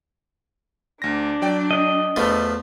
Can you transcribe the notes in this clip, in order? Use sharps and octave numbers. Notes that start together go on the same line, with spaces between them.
D2 D4 A#6
F#3 D5 G5
D#5
E2 F3 A3 B3